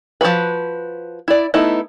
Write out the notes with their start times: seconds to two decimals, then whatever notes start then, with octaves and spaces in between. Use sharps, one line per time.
0.21 F3 A3 F#4 B4
1.28 E4 D5
1.54 A3 B3 D#4 E4